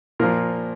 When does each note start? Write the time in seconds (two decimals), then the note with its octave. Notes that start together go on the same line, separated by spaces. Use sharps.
0.19 A#2 F3 A#3 A#4